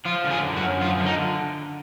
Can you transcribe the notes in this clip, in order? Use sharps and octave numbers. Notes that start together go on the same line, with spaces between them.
F3 F4
D3
G#4
F#2
F#4
F#2
F3 F4
D3
D#4